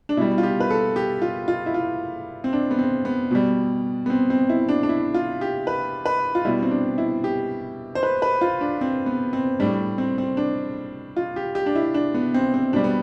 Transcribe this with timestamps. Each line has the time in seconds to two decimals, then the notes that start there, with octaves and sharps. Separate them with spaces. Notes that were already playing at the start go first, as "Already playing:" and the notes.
0.09 D4
0.17 B2 E4
0.21 G3
0.38 F4
0.43 G4
0.60 B4
0.71 A4
0.96 G4
1.22 F4
1.48 F4
1.66 E4
1.74 F4
2.44 C4
2.53 D4
2.71 B3
2.79 C4
3.05 B3
3.31 B2 G3
4.06 B3
4.10 C4
4.30 C4
4.49 E4
4.69 D4
4.83 D4
4.89 E4
5.14 F4
5.41 G4
5.67 B4
6.06 B4
6.35 F4
6.45 B2 G3 E4
6.62 C4
6.71 D4
6.98 E4
7.24 G4
7.95 C5
8.03 B4
8.22 B4
8.41 F4
8.61 D4
8.81 C4
9.06 B3
9.33 C4
9.60 A2 G3 D4
9.98 C4
10.18 C4
10.37 D4
11.16 F4
11.36 G4
11.55 G4
11.66 D4
11.75 E4
11.94 D4
12.14 B3
12.34 C4
12.54 C4
12.73 B2 G3 D4
12.84 B3